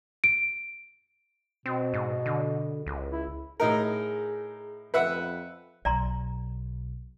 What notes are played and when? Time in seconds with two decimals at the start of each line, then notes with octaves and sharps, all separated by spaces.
0.24 D7
1.66 B2 C4
1.94 G#2
2.26 D3
2.87 C#2
3.11 E4
3.60 A2 D#4 G#4 A#4
4.94 F2 B4 E5 F#5
5.85 B1 D5 A#5 C6